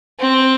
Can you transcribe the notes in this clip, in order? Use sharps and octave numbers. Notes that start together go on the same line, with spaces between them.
C4